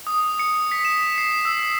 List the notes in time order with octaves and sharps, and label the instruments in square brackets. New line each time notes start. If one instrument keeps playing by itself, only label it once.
[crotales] D#6
C#7
B6
E7
C7
E6